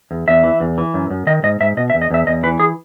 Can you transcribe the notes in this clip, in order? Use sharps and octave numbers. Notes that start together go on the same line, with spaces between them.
E2
E2 E5
E3
E2
E3
F#2
F#2
D#3 D#5
G#2 D#5
G#2 E5
B2 D#5
E5
E2
D#5
E2 E5
E2 D#5
E3 B4
G#4